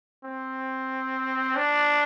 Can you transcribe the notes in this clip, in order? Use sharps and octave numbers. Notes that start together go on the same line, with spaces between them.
C4
D4